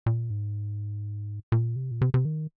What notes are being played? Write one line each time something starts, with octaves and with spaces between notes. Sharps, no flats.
A#2
G#2
A#2
C3
A#2
C3
C3
D#3